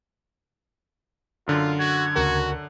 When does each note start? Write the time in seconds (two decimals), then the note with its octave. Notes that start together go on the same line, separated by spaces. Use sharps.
1.47 F#2 D3 F4
1.79 F#4 G#6
2.16 D2 C#3 F#4 A#4